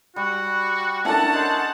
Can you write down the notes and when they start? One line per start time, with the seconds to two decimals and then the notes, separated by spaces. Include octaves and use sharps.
0.16 G3 F#4
1.05 C#4 D4 E4 A4 A#4 F#5 A5
1.34 C5 D#5